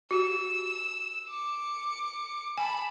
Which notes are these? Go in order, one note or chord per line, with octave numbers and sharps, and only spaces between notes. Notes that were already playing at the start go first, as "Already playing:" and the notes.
F#4 G4 E6
D6 C#7
G#5 A5 B5